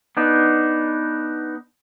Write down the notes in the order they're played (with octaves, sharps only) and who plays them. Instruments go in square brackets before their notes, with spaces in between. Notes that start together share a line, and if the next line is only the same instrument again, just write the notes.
[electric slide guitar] B3 D4 D#4